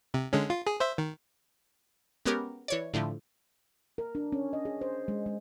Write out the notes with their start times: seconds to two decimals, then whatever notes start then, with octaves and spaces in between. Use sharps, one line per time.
0.14 C3
0.33 D3 G#3 C#4
0.50 F4
0.67 G#4
0.80 C5 E5
0.98 D#3
2.25 G#3 B3 C#4 G4 A#4 D6
2.68 E3 C#5 D5
2.94 A2 D3 F3 A3
3.98 A#4
4.15 D4
4.32 C#4
4.53 D#5
4.65 G#4
4.81 C5
5.08 G#3
5.26 G#3